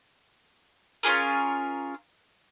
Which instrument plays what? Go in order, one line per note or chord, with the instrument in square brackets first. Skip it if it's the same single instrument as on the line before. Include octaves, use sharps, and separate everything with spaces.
[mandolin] C#4 F4 G#4 A#4